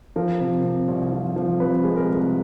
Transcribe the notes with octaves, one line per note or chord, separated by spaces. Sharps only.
F3 A#4
C3
C3
C2
F3
F3
C3 B4
G#3
A#4
C2